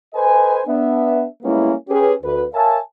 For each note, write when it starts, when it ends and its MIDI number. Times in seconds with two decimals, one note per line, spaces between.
0.14 0.61 69
0.14 0.61 71
0.14 0.61 72
0.14 0.61 75
0.14 0.61 80
0.67 1.25 59
0.67 1.25 62
0.67 1.25 76
1.43 1.72 55
1.43 1.72 56
1.43 1.72 58
1.43 1.72 59
1.43 1.72 61
1.43 1.72 64
1.89 2.12 61
1.89 2.12 67
1.89 2.12 68
1.89 2.12 71
2.23 2.44 38
2.23 2.44 71
2.54 2.78 70
2.54 2.78 73
2.54 2.78 76
2.54 2.78 77
2.54 2.78 80
2.54 2.78 81